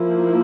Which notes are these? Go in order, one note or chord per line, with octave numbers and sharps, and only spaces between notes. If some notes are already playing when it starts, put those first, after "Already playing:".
Already playing: F3 A#3 E4